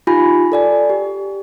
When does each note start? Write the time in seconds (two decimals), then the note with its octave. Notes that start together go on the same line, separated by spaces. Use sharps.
0.07 D#4 F4 G4 G#5 B5
0.52 A4 D5 G#5
0.90 G4